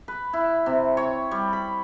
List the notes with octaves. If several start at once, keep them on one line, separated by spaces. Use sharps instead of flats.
B4
E4
C3
C#5
G3
B5